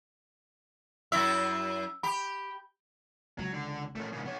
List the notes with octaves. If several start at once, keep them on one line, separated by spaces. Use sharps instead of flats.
F#2 E4 E5 E6
G4 B5
C#2 F#3
D3
A#2 A3 C#4
G#2 C#3
B3 C#5